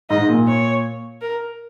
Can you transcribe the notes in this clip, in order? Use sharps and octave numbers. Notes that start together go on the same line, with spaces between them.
G#2 D#5
A#2
C#5
A#4